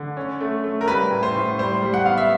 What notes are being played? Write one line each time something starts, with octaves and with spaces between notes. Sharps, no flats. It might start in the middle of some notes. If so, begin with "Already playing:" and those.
Already playing: D3
C#4
A3
A3
A#4
G3 B4
A2
C5
A2
G3 C5
G3
F#5
B3 F5
E5